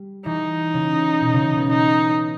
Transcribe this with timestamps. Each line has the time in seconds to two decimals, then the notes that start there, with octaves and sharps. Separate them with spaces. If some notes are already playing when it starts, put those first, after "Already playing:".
Already playing: G3
0.25 E3 D#4
0.74 C#3
1.21 B2
1.33 C#3
1.45 E3
1.57 B3
1.69 D#4